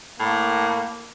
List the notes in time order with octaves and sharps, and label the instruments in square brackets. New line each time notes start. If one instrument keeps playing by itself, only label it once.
[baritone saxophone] A2 [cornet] A#3